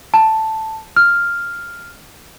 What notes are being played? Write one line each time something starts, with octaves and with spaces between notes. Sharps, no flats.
A5
F6